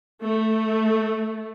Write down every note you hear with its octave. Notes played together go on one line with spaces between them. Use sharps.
A3